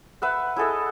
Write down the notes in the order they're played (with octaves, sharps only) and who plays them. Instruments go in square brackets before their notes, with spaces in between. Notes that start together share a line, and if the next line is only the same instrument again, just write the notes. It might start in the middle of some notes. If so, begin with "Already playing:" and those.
[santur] B4 E5 F#5
E4 G#4 A4 D#5